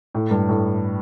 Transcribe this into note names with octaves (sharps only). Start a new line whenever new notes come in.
A2
G2
A2